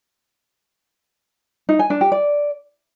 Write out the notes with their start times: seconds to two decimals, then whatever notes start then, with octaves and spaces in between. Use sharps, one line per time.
1.69 D#4
1.79 G#5
1.90 D4
2.01 G4
2.12 D5